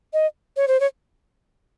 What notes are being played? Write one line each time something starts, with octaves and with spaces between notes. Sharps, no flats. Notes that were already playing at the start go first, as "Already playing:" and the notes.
D#5
C#5
C5
C#5